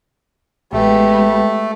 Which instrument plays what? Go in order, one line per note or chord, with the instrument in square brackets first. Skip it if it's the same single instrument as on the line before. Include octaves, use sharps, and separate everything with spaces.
[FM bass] A1 [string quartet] G#3 B3 G4 [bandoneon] A3